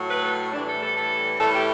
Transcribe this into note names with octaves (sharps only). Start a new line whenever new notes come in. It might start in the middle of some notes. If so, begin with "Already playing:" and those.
Already playing: A2 F#3
B4
A4
A2 E3 G3 D4
A4
A4
A4
A2 E3 G3 A4
G4